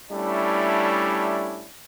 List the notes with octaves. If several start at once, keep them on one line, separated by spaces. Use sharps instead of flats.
G3 A3 C#4 D4 E4